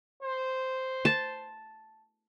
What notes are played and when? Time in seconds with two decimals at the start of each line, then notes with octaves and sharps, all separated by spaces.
0.23 C5
1.05 A5